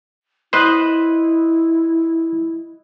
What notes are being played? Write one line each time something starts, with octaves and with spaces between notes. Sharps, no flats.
E4 B4 C5 D#5 F#6